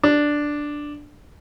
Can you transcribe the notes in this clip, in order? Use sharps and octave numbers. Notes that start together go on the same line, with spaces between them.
D4